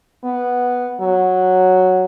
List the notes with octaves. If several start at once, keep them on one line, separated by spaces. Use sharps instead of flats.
B3
F#3